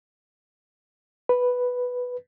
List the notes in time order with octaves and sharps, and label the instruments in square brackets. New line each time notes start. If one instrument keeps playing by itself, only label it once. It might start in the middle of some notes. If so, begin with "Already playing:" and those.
[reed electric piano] B4